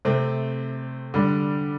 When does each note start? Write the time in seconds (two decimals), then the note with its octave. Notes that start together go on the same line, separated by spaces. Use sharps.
0.05 C3 A3 C4
1.14 D3 G3 D4